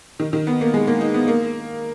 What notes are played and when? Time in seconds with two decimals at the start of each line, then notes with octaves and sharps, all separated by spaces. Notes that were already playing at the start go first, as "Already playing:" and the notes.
0.20 D#3
0.33 D#3
0.47 B3
0.61 A#3
0.74 G#3
0.87 A#3
1.01 D#4
1.14 B3
1.28 A#3